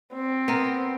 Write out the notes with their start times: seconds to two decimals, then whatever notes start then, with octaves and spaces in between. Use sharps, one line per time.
0.14 C4
0.48 B3 A#4